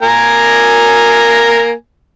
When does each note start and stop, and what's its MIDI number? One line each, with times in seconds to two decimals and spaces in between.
0.02 1.73 58
0.02 1.73 70
0.02 1.73 80